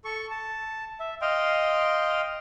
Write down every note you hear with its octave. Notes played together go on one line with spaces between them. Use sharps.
A4 C#6
A5
E5
D#5 F5 G5 C6